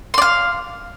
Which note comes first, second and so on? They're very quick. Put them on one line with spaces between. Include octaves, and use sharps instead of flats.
C6 D5 F5